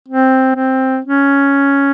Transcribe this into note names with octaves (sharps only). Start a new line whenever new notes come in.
C4
C4
C#4